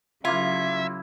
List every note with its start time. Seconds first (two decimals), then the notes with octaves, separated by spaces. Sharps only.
0.25 C#3 F#3 A#3 E4 F4 E5